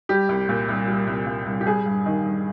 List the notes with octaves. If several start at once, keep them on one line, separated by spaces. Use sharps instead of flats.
G3 G4
C2
A#2
C2
G3
C2
A#2
C2
G4
G3 G#4
G2
D#3
G2